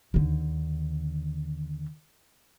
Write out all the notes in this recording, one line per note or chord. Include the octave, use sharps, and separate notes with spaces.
D#2 D3